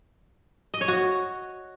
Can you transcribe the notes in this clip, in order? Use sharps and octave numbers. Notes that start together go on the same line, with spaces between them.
D#5
C#5
F#4